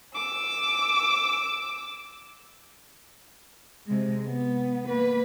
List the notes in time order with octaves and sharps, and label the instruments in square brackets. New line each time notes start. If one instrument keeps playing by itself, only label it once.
[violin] D6 E6
[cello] C3 G#3
B3
A#3 B4